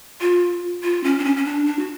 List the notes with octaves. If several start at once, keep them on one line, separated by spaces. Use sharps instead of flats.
F4
F4
C#4
D4
C#4
C#4
D4
D4
F#4